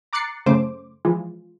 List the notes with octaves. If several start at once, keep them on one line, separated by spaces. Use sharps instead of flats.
A#5 D6 F#6 A6 C7 C#7
F#2 C#3 A3 C5 D6
E3 F3 G#3 F4